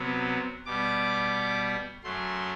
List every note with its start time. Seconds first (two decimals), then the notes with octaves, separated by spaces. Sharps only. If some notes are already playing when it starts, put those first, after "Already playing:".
Already playing: C3 F#3 B3
0.66 B2 G3 B3 D6
2.04 F#2 F#3 A3 C6